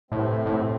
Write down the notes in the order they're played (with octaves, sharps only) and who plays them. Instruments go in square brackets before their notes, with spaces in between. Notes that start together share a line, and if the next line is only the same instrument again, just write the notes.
[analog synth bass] A2 [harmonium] C3 E3 A3 C4
[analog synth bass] A2